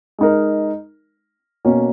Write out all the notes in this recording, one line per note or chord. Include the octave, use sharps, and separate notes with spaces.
G#3 D#4 A#4
B2 A#3 C#4